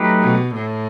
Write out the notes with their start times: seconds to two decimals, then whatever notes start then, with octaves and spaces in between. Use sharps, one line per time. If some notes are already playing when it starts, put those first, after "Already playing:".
Already playing: F#3 A3 D#4 G4 B4
0.21 B2
0.55 A2